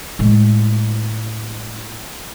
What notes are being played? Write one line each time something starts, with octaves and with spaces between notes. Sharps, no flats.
A2 G#3